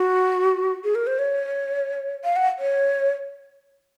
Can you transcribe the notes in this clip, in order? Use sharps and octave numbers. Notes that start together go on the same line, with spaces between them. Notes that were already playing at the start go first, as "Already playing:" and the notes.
Already playing: F#4
G#4
A#4
C5
C#5
F5
F#5
C#5